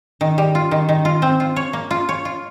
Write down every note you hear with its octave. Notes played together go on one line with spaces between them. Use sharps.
D#3
G3
F4
D#3
D#3
F4
C4
F4
C#5
A#3
F4
C#5
F4